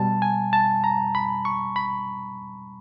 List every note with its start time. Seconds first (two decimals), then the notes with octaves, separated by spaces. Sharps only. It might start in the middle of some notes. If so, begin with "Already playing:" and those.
Already playing: B2 G3 A5
0.22 G#5
0.53 A5
0.84 A#5
1.15 B5
1.45 C#6
1.76 B5